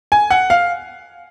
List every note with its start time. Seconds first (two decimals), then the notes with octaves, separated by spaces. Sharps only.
0.12 G#5
0.31 F#5
0.50 F5